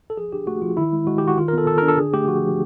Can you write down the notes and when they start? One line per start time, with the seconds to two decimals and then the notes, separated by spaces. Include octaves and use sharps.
0.10 A4
0.17 F3 G#4
0.32 D4 G4
0.47 A3 F#4
0.62 F3 F4
0.77 D#3 E4
0.93 G#3
1.07 G#3 F#4
1.18 G4
1.23 D#3 F#4
1.37 D#3 F4
1.48 A#4
1.53 B3 A4
1.67 D#3 A4
1.78 A#4
1.82 D4
1.88 A4
1.97 D3 G#4
2.13 A3 G4
2.27 F3 F#4
2.44 F3